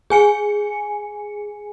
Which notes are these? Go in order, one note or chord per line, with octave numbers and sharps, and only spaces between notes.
G#4 G#5 C#7